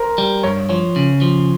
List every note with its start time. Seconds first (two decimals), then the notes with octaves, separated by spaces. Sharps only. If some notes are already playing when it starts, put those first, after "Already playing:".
Already playing: A#4 C5
0.18 G3
0.43 G2 C#5
0.69 F3 C#5
0.96 C#3
1.21 F3